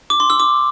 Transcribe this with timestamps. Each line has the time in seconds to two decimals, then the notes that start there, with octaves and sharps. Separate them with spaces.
0.10 D6
0.20 C6
0.30 E6
0.40 D6